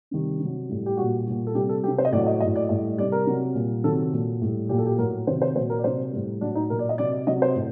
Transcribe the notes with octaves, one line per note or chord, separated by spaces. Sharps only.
C3 D#3 G3
C3 F#3
A2 G3
G4
A#2 G3 F#4
A#2 G3
A4
C3 G3 G4
A4
C3 F#3 G4
C5
D#5
A2 F#3 D5
D#5
A2 F#3 D#5
D5
A2 G3 D#5
C3 G3 D5
A#4
C3 F#3
A#2 G3
C3 D#3 F#3 A4
A#2 F#3
A2 G3
A#2 F#3 G4
A4
G4
A2 F#3 A#4
C3 D#3 F#3 C5
C5
A#2 F#3 C5
A#4
D5
C3 F#3 C5
A2 G3
A2 F#3 D4
D#4
A#2 F#3 A#4
D5
D#5
C3 F#3 D5
C3 F#3 D#5
C5
A2